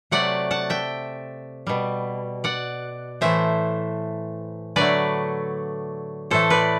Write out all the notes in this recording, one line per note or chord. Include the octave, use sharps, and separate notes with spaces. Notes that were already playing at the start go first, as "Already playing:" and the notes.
C3 F#3 A3 D5 F#5
F#5 A5
E5 G5
B2 G3
D5 F#5
A2 E3 A3 C5 E5
D3 F#3 A3 B4 D5
A2 E3 A3 A4 C5
B4 D5